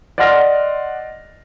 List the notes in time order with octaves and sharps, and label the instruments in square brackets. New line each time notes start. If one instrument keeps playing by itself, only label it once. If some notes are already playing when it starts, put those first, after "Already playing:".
[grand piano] D5 D#5 F#5 C6 F6 A#6